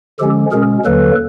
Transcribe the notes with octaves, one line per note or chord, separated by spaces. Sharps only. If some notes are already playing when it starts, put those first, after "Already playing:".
D3 F3 G#3 C#4 G4 A4
B2 G#3 C#4 G#4 A#4
D#2 D3 F#3 A#3 A4 B4